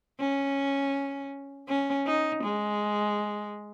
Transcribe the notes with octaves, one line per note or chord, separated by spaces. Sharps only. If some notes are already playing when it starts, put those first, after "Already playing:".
C#4
C#4
D#4
G#3